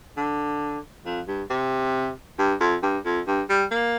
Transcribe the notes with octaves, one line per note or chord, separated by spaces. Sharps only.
D3
F2
G2
C3
G2
F2
G2
F2
G2
G3
A#3